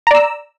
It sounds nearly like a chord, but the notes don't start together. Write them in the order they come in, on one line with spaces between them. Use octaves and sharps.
A#5 D5 E6